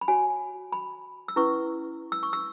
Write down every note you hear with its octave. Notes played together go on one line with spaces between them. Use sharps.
B5
F#4 C#5 G#5
B5
E6
C#4 E4 B4 C#6
E6
C#6
E6